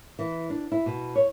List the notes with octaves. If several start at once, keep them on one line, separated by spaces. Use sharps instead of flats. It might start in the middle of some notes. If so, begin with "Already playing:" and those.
E3
D4
E4
B2
C#5